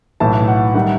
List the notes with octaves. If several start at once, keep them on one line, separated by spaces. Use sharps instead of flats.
B1 A2 E3 A5
F#5
D#3 G3 F#5